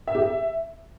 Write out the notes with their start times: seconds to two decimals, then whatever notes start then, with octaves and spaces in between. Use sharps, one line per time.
0.07 E5
0.15 G4
0.22 E5